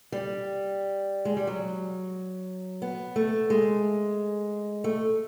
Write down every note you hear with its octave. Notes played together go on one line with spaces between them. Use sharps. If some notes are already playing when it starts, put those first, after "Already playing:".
G3
G#3
G3
F#3
B3
A3
G#3
A3